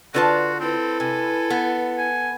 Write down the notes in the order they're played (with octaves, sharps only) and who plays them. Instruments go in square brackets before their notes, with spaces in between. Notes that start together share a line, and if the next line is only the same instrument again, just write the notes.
[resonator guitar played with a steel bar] D3 F4 A5 [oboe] F#4 [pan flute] B4
[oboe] C4 [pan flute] E4 [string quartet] A4 B4
[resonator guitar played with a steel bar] C3 [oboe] G#5
[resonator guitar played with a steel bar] B3
[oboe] G#5